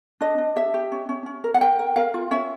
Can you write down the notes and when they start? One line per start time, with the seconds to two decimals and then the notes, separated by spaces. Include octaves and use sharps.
0.21 D4 D#5
0.38 D4
0.56 G4 E5
0.74 G4
0.92 C#4
1.09 C#4
1.26 C#4
1.44 A#4
1.54 F#5
1.61 A#4 G5
1.79 A#4
1.96 A#4 F5
2.14 F4
2.31 C#4 E5